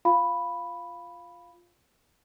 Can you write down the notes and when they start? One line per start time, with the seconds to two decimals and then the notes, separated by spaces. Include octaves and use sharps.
0.05 F4 F5 B5